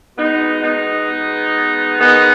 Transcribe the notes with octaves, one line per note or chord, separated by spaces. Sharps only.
B2 G#3 B3 D#4
B3 D#4
B2 G#3
G#2 D#3 G#3 B3 D#4